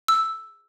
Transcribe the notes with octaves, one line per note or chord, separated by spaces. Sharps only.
E6